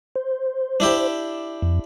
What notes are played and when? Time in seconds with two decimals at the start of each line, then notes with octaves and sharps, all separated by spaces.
0.16 C5
0.80 D4 E4 G4
1.62 F2